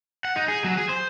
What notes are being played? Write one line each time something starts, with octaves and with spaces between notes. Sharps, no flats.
F#5
D#4
G#4
F#3
G#4
C5